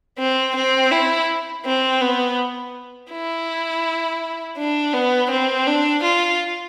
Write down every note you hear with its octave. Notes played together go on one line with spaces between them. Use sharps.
C4
C4
E4
C4
B3
E4
D4
B3
C4
D4
F4